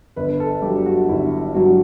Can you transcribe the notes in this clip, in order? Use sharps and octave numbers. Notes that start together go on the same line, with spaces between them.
G1 B4
A4
G2 F#3 G4
F#4
G1 E4
G2 F#3 F#4